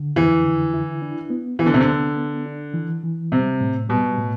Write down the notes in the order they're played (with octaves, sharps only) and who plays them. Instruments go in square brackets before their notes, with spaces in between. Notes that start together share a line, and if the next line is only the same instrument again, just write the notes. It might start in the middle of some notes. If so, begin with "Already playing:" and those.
Already playing: [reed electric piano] D3
[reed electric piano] F2 [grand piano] E3
[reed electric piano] D3
E4
D4
B3
[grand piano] E3 [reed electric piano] B3
[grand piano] D3
C3
D3
[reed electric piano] B3
B3
D4
E3
E3
[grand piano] C3 [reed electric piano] G3
[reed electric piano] A2
[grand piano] B2 [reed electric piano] G3
[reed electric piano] A2